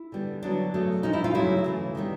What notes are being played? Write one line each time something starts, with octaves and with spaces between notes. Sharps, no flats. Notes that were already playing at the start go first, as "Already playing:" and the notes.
Already playing: E4
D3 G3 B3
D3 F#3 B3 D4
C#3 F#3 A3
A#2 F3 A#3 D#4
E4
F4
C#3 F#3 A3 E4
C#3 E3 A3
D#3 G3 B3